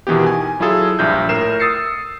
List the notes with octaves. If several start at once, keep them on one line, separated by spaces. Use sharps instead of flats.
B2 D#3 E3 B3 G4
G#5
F#3 E4 F4 G#4 A4
A#1 G2 E5 G6
A2 A#4 C7 E7
D#6 E6 A6 C7 C#7